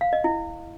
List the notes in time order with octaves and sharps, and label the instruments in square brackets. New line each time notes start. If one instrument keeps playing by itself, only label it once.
[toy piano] F5
D#5
E4